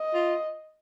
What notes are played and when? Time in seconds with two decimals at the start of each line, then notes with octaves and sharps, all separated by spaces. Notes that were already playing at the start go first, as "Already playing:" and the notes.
Already playing: D#5
0.14 F4